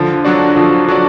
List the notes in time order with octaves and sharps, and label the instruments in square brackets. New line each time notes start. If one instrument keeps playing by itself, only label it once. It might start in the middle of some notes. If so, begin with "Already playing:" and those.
Already playing: [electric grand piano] D3 [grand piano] F3
[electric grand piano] F#3 D4 F#4 D5
[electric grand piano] D3 [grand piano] F3
[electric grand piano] F#3 D4 F#4 D5